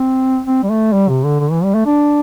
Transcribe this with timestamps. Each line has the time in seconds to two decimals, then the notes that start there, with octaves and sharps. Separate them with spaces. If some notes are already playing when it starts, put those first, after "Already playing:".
Already playing: C4
0.46 C4
0.63 G3
0.70 A3
0.93 G3
1.08 C3
1.24 D3
1.39 D3
1.51 E3
1.63 G3
1.74 A3
1.86 D4